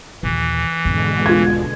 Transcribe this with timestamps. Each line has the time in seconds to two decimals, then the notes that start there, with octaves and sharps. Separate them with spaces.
0.23 A#1 D#2 E3
0.85 G#1 E2 B2 D3 G#3
1.26 F4 G#6